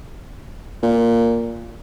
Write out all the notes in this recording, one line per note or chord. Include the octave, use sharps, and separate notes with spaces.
A#2